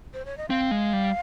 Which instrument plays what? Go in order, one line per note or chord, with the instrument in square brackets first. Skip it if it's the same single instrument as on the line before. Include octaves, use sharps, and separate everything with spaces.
[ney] C5
C#5
D#5
[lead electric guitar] C4 [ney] F5
[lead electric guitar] G#3
G3